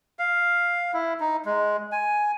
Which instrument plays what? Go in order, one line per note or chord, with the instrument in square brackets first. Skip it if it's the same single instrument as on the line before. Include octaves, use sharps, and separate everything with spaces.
[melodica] F5
E4
D#4
G#3
G#5